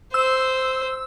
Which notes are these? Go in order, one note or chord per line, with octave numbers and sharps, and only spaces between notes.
C5 E6